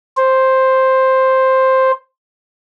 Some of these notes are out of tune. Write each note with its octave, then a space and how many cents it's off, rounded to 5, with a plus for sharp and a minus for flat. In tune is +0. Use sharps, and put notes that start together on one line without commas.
C5 +5